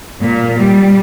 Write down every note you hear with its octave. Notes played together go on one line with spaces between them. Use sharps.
A#2
G3